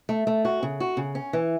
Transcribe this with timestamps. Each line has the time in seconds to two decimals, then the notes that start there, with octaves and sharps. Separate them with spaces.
0.09 A3
0.27 A3
0.45 F#4
0.63 C#3
0.80 F#4
0.97 C#3
1.15 C#4
1.33 E3